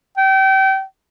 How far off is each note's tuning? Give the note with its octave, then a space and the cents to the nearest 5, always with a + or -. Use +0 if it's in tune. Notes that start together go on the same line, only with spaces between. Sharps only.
G5 -30